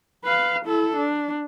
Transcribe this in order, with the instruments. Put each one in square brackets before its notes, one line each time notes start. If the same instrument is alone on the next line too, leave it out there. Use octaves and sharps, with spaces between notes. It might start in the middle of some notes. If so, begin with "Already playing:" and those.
[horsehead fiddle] B4 F5
E4 A4
D4